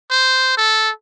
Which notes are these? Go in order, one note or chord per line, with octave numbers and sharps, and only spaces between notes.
C5
A4